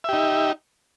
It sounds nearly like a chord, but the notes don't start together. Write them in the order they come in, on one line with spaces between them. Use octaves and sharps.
E5 G4 D#4